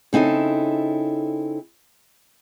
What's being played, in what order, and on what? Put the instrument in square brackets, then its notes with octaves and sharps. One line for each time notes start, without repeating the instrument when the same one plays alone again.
[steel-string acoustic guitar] C#3 C4 D#4 E4 A4